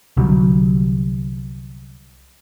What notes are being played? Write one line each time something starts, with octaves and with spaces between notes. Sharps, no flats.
C2 D3 F#3 G3